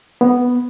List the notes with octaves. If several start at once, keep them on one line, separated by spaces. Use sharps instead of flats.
B3